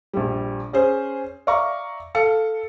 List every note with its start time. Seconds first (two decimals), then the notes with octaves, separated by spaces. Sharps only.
0.13 A#1 G3
0.73 C#4 G#4 C5
1.47 D5 E5 F5 A#5 C#6
2.15 A4 F5 C#7